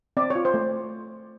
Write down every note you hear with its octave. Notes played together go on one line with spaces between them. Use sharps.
C4 D5
F4 C#5
C5
A3